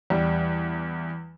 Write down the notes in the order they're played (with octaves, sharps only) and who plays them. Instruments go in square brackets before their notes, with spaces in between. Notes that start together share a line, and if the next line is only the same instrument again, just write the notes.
[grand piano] E2 G3